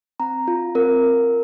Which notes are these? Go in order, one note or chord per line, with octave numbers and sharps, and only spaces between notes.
C4 A#5
F4
C4 A#4
F4